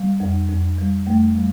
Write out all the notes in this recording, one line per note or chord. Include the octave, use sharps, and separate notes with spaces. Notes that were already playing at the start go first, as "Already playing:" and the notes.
Already playing: G3
F2
F2
G3
F2 A3
G3